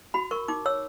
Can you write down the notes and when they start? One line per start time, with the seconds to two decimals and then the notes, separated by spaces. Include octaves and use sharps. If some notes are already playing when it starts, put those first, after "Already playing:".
0.14 F#4 B5
0.31 A#4 C#6
0.48 D#4 D6
0.66 C#5 E6